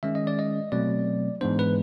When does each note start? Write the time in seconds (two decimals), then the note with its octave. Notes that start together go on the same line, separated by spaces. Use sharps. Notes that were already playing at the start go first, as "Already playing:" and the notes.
0.03 D#3 G#3 C#4 E5
0.15 D#5
0.27 D5
0.39 D#5
0.72 B2 F#3 A3 C4 D5
1.41 G#2 E3 G#3 B3 D4 C5
1.59 B4